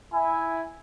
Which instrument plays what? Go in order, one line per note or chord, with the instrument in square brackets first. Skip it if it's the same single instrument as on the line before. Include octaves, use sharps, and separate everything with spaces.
[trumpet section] E4 G#5